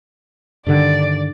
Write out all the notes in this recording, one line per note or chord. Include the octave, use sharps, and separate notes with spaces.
G2 D3 D#3 D5